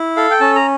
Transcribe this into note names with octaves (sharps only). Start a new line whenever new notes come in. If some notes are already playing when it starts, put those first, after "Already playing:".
Already playing: E4
A4 F5
G5
C#4 A5
A#5